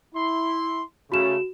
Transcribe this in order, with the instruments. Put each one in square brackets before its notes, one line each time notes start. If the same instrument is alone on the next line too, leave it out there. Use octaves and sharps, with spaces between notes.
[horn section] E4 C6
[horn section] C#3 A3 [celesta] F#4 E7